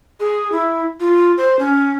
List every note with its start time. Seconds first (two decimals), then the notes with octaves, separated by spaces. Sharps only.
0.20 G#4
0.52 E4
1.00 F4
1.38 C5
1.59 C#4